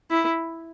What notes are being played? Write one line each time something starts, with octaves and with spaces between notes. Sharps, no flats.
E4